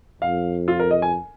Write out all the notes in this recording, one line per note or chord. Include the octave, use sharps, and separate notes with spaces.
F2 F5
F4
A#4
D#5
G#5